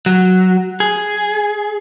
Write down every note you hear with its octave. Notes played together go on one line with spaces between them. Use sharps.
F#3
G#4